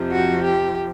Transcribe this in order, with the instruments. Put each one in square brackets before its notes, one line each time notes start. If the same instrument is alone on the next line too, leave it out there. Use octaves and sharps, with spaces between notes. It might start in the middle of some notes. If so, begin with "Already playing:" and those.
Already playing: [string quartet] F2 C3 F3
F#4
G4